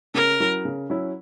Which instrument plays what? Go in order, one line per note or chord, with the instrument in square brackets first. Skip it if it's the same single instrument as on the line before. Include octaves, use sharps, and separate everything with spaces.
[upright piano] C#3 [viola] A#4
[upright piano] F#3 C#4 E4
C#3
F#3 C#4 E4